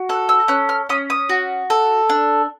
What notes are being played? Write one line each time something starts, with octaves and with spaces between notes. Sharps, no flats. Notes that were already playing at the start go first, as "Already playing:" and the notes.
Already playing: F#4
A4 F#6
E6
C#4 F#6
F6
C#4 D#6
D#6
F#4
A4
D4